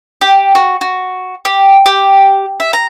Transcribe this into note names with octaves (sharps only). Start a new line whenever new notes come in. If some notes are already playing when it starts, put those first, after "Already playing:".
G4
F#4
F#4
G4
G4
E5
A#5